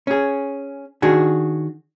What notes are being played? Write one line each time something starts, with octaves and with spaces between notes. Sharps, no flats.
C#4 G#4
D#3 D4 F#4 G#4